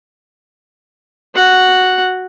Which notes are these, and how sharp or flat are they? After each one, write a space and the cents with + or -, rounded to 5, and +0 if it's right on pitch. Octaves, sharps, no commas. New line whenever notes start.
F#4 +0 F#5 +0